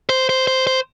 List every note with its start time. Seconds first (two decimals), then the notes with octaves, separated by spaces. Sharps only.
0.09 C5
0.29 C5
0.47 C5
0.67 C5